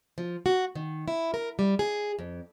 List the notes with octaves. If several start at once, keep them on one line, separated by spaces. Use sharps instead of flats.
F3
F#4
D#3
E4
A#4
G3
G#4
F2